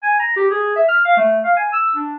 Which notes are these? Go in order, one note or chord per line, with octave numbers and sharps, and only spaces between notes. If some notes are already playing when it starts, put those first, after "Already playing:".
G#5
A#5
G4
G#4
E5
F6
F5
A3
F5
G#5
E6
D4